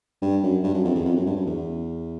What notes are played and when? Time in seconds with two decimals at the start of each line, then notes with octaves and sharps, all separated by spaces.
0.22 G2
0.43 F#2
0.64 G2
0.74 F#2
0.85 F2
0.95 E2
1.05 F2
1.16 F#2
1.26 G2
1.36 F#2
1.47 E2